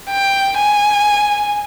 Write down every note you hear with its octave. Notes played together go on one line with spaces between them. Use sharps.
G5
G#5